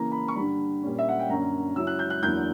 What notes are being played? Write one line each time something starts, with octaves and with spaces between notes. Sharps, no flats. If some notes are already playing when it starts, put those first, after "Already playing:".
Already playing: C#3 E3 A#3 A#5
B5
C#6
G2 D3 G3 B5
A#2 G3 C#4
E5
F#5
G5
F#2 D3 A#3 C#4 A#5
C#3 F#3 C#4 E4 E6
F#6
G6
F#6
E2 D3 F#3 A#3 E4 G6